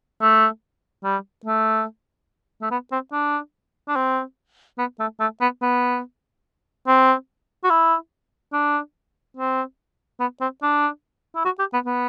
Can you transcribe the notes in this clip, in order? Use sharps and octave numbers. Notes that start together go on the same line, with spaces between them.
A3
G3
A3
A3
B3
C4
D4
D4
C4
B3
A3
A3
B3
B3
C4
F#4
E4
D4
C4
B3
C4
D4
E4
F#4
G4
B3
B3